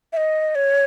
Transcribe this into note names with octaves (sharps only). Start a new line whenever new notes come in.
E5
D#5
C#5